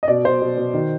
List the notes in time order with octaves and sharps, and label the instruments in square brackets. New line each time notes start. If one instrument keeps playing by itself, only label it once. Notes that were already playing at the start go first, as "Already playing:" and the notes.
[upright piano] D#5
B2 D5
B2 C5
B2
B2
D#3